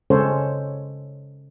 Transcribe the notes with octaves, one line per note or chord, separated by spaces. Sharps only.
C#3 G#3 C#4 A4 C5 C#5